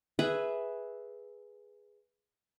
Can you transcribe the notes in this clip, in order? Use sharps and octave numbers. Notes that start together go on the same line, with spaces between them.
G#4 B4 E5 G#5